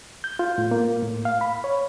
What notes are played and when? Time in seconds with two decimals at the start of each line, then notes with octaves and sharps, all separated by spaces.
0.24 G6
0.39 F4
0.58 A2
0.71 A#3
1.02 A2
1.25 F5
1.41 B5
1.64 C#5